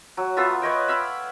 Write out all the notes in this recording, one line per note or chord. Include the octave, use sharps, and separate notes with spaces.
F#3
B3 F4 A4 E5
B4 C#5 D#5 G5
E5 F5 B5